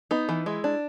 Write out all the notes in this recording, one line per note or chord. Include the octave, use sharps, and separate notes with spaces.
B3 D#4
E3
G#3 E4
D4